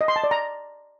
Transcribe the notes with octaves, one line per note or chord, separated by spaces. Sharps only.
D#5
C6
A5
D5
A#5